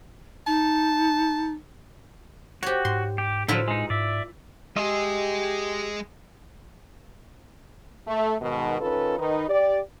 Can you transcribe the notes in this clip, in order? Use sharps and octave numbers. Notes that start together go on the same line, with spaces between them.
D#4 A5
F#4 G4 C#5
G#2 C6
G4
A2 D3 F3 F#3 E4 F4 B4
G#3 D#4
G#2 D5 E5
G#3 G4 G#4 D#5 E5 C6
A3
G#2 B2 D#3
D#3 C#4 F4 A4 B4
D#3 D#4 B4
G4 D5